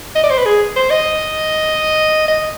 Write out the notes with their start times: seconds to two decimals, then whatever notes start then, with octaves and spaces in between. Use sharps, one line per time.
0.15 D#5
0.23 D5
0.30 C5
0.38 B4
0.45 G#4
0.76 C5
0.90 D#5
2.28 D#5